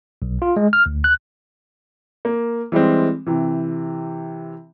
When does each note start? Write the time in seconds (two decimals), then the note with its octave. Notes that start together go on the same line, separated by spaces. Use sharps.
0.22 B1
0.42 F4
0.56 G#3
0.73 F6
0.86 D2
1.04 F#6
2.25 A#3
2.72 E3 G3 G#3 C4
3.27 C3 E3